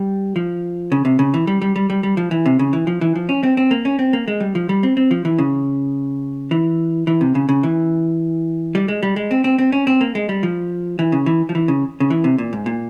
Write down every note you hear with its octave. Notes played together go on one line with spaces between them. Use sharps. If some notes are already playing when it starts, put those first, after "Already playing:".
Already playing: G3
F3
C#3
C3
C#3
E3
G3
G3
G3
G3
G3
F3
E3
C3
C#3
E3
F3
E3
F3
C#4
C4
C4
A#3
C#4
C4
A#3
G#3
G3
F3
G3
C4
C4
F3
E3
C#3
E3
E3
C3
C#3
C#3
E3
G3
G#3
G3
G#3
C4
C4
C4
C#4
C4
A#3
G#3
G3
F3
E3
C#3
E3
F3
E3
C#3
C#3
E3
C3
A#2
G#2
A#2